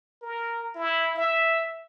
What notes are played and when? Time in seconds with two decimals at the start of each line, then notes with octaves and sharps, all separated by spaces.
0.22 A#4
0.75 E4
1.16 E5